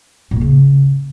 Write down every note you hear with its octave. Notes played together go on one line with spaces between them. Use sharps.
A#2
A#3
C#3